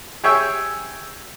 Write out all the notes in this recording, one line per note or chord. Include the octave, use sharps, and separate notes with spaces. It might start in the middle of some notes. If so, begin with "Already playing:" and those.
G4 G#4 C#5 E5 G5